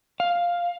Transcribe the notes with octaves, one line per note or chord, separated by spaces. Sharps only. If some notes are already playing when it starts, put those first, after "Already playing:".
F5